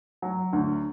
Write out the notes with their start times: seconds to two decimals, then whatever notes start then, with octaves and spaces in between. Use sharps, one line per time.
0.22 F#3
0.53 D2